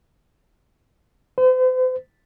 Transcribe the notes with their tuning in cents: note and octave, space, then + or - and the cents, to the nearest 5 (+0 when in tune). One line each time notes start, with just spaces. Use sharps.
C5 -40